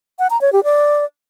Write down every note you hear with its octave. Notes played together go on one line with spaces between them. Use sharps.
F#5
A#5
C#5
G4
D5